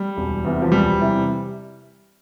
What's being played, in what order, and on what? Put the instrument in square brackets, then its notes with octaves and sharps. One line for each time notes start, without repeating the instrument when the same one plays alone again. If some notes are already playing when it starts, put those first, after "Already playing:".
Already playing: [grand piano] G3
E1
E2 C3 E3
F3
E1 G3
C3 E3